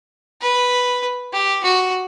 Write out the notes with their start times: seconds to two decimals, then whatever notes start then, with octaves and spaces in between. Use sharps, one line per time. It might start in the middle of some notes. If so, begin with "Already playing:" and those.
0.42 B4
1.33 G4
1.63 F#4